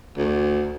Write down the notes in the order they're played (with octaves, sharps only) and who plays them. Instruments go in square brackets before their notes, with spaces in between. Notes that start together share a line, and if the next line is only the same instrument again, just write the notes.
[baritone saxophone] D2